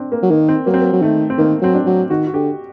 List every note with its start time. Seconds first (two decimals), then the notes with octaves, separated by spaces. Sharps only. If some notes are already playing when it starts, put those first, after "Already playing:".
Already playing: C4 D4
0.12 A#3
0.23 F#3
0.30 D#3 A#3
0.49 C4
0.66 F#3 A#3
0.74 C4
0.81 A#3
0.93 F#3
1.02 D#3 A3
1.30 C4
1.38 D#3 A#3
1.61 F#3 C4
1.74 D4
1.86 F#3
2.10 D#3 F#4
2.27 F#4
2.34 D3 G4